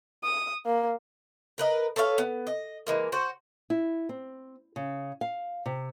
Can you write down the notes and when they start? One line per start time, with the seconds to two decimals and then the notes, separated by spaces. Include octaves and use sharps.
0.24 D#6
0.66 A#3
1.58 A#4 B4 D#5
1.96 A4 B4 C#5 F5
2.18 B3
2.47 D#5
2.87 E3 G#3 A#3
3.12 F#4 C5
3.70 E4
4.09 C4
4.76 C#3
5.21 F5
5.66 C3